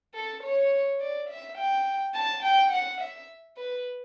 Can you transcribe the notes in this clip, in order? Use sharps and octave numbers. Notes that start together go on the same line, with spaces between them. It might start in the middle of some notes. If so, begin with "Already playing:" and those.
A4
C#5
D5
E5
G5
A5
G5
F#5
E5
B4